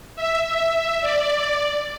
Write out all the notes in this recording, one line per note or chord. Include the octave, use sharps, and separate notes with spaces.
E5
E5
E5
D5